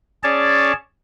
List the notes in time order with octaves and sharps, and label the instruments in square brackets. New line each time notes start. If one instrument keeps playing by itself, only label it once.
[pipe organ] C#4 G#4 C#5 D5 A5